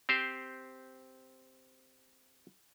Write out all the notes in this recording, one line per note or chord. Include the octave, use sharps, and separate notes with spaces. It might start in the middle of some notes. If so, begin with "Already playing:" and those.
C4 G4 C5